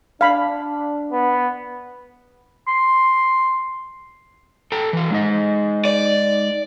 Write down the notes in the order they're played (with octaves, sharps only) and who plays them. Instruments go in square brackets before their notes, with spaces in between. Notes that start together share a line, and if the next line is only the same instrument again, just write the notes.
[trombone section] D4 [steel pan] F5 B5
[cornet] B3
[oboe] C6
[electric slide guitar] A4 G5 A#5
E3 F5
G#3 D#4 D#5
[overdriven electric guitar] D5